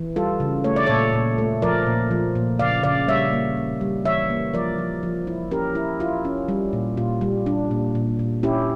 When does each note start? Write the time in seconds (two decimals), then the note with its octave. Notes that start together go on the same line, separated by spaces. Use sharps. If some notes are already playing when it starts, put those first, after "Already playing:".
Already playing: E3
0.16 G3 F4 A4
0.40 C#3
0.64 A3 C#5
0.76 D5
0.86 A#2 A4 C#5
1.13 A#2
1.38 A3
1.62 F3 A#4 D5
1.86 A#2
2.11 F3
2.35 A#2
2.59 C#3 D5 F5
2.83 C#3 D5 F5
3.08 G3 C#5 E5
3.33 A#3
3.57 A#3
3.81 G3
4.05 E3 C#5 E5
4.30 A#3
4.54 F3 A#4 D5
4.78 F3
5.03 F3
5.27 E4
5.51 C#4 G4 A#4
5.75 E4
6.00 E4 F4
6.25 C#4
6.49 G3
6.73 A#2
6.97 A#2 F4
7.21 G3
7.46 D4
7.71 A#2
7.95 A#2
8.19 A#2
8.43 C#4 E4 G4